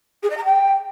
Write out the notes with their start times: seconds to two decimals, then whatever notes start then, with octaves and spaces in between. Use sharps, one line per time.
0.23 G#4
0.30 D#5
0.37 A#5
0.44 G5